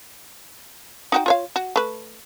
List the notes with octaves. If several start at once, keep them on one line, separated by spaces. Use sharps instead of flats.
D#4 F#4 G5
F4 C#5 F5
F#4
A3 B4